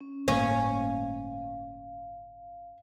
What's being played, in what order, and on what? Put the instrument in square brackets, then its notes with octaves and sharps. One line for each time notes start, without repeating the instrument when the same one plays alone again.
[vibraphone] C#4
[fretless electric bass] G1 A2 A#3 [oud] C#4 [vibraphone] F5